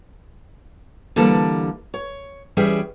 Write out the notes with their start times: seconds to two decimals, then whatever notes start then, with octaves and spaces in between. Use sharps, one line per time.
1.16 D3 E3 G3 A#3 A5
1.94 C#5
2.57 E3 G3 C#4 G#4 E5 G5